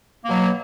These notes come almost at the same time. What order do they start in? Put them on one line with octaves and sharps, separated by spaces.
A#3 B2 F#3